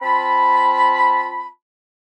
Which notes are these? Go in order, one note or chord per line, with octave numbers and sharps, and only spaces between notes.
C4 F4 A5 B5